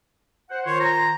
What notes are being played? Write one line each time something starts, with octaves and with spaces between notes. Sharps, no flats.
C5 F#5
D#3 F4 C5 C#5
A#5